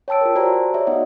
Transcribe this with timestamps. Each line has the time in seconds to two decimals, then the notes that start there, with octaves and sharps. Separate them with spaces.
0.08 C#5 G5 A5 E6 D7
0.21 F4 G#4 A#4
0.36 F#4 G4 C5 D5 A5 A#5
0.53 A#5
0.74 G#4 C#5 D5 E5
0.87 B3 D#4 F#4 D#5 F#5